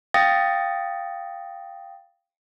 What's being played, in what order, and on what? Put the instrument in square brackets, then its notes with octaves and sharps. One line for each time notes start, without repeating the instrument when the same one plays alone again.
[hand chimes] F5 G5 D#6 A6 A#6